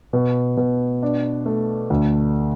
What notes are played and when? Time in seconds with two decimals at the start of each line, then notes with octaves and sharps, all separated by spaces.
0.13 B2
0.57 B2
1.03 D4
1.46 A3
1.90 D2